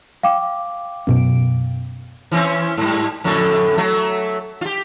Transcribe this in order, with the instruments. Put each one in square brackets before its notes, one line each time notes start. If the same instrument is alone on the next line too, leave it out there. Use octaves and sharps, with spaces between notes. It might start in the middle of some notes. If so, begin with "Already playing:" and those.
[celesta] F5 G5 D6
[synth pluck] F#2 B2 D7
[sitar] E3 C4 C#4
G#2 G3
F2 A2 D3
F#3 A3
F4 G4